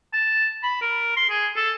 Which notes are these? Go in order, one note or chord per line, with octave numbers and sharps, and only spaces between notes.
A5
B5
A#4
C6
G#4
A4